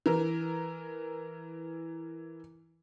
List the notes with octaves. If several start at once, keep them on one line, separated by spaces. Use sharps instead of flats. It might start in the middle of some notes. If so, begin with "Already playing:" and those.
E3 A#4